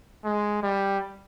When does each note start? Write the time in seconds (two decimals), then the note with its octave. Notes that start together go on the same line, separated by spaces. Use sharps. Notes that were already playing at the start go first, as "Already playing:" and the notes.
0.25 G#3
0.63 G3